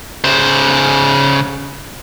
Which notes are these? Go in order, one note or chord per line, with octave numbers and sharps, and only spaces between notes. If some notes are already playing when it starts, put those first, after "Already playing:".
C#3 C5